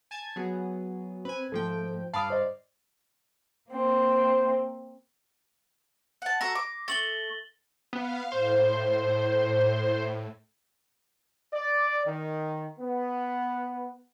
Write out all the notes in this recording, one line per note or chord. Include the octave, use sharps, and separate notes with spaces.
G#5 A5 G#6
F#3 B3 G#4
C4 B4 G#5
G#2 F3 A3 A4 G5
G2 D5 F5 A5 B5 D#6
C5 D#5
A#3 C4 C5
F#5 A5
F#4 A4 A#5 A#6
D6
A3 A6 F#7 G7
B3 F5
A2 C5
D5
D#3
B3